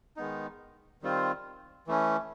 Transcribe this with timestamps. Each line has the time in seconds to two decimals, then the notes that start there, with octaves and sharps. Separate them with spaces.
0.17 D#3 G#3 B3 D#4
1.02 D#3 G3 C4 F4
1.87 E3 A3 C#4